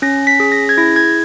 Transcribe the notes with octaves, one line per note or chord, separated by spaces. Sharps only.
C#4 A#6
B6
G#4
A#6
G#6
E4 A#6
G#6